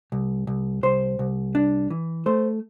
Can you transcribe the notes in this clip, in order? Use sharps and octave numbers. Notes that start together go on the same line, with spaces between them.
C2
C2
C2 C5
C2
D4
E3
A3 C5